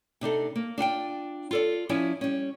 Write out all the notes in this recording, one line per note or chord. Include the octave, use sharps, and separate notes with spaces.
C3 D4 D#4 A4
A#3
D4 F4 F#5 G5
F4 A4 D5
F3 C#4 E4 D5 G#5
G3 C#4